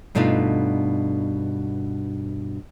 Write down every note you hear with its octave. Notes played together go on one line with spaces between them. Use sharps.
G2 B2 A3 D4 D#4 F4